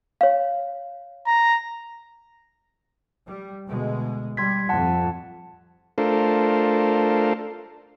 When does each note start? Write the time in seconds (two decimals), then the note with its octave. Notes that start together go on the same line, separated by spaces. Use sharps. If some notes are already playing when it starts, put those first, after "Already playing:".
0.21 C#5 F5
1.27 A#5
3.27 G3
3.65 D2 B2 G#3
4.37 G3 C6 G#6 B6
4.69 F2 F#5 A5
5.98 A3 D4 F4 A4 A#4 C5